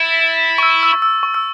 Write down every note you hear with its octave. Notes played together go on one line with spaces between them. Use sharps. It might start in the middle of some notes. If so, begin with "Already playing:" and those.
Already playing: E4 A6
C#6
E6
E6
C#6
E6
C#6
E6